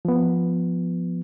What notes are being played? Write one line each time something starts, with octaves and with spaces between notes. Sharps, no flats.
F3 B3